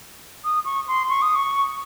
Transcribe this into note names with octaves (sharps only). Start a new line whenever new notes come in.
D#6
C#6
C6
C#6
D#6
C#6